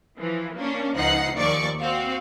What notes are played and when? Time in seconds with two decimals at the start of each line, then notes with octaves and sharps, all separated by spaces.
0.19 E3 F3
0.55 A#3 C#4 D4
0.96 C#2 F3 D#4 F#5 F#6 C7
1.37 D#2 A#2 F3 D5 C#6
1.79 C4 F#4 F5